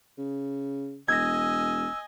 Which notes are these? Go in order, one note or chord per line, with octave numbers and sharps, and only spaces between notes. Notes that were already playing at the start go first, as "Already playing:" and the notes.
C#3
E1 D#5 G#5 E6 G#6 A#6